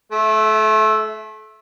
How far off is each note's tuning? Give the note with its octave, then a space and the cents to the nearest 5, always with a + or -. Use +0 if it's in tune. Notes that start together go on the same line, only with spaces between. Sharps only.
A3 -30 E5 +0